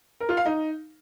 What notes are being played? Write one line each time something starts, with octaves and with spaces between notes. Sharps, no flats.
A#4
F4
F5
D#4